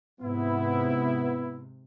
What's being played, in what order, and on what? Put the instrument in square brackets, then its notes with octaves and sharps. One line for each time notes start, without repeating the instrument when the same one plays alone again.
[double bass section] G#2 C3 [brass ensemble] B3 E4